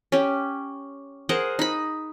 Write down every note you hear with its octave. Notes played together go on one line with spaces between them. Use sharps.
C#4 G4
G#4 A#4 C5 F#5
D#4 B5